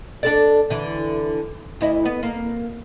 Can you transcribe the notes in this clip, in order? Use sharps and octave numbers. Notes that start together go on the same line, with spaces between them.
D4 A4 D5
D3 E3
D2 E4 D#5
B3
A#3